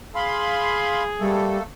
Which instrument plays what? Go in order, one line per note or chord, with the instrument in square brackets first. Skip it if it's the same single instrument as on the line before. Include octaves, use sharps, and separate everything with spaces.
[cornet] G#4 [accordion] F5 B5 C6
[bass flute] G3 [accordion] A3 A#3 A4